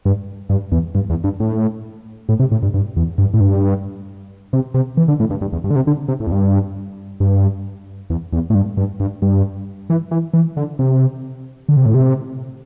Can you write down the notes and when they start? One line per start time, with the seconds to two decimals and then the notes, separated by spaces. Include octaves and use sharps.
0.05 G2
0.49 G2
0.72 E2
0.95 G2
1.10 E2
1.24 G2
1.40 A2
2.29 A2
2.39 C3
2.52 A2
2.63 G2
2.74 G2
2.97 E2
3.18 G2
3.34 A2
3.41 G2
4.53 C3
4.74 C3
4.97 E3
5.08 D3
5.20 A2
5.30 G2
5.41 G2
5.53 E2
5.64 G2
5.71 D3
5.76 C3
5.87 D3
6.08 C3
6.20 A2
6.27 E2
6.32 G2
7.20 G2
8.10 E2
8.33 E2
8.50 A2
8.55 G2
8.77 G2
9.00 G2
9.22 G2
9.90 E3
10.11 E3
10.34 E3
10.57 D3
10.79 C3
11.69 D3
11.77 C3
11.86 A2
11.94 C3